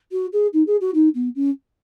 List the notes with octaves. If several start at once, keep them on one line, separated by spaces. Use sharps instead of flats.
F#4
G#4
D#4
G#4
F#4
D#4
B3
C#4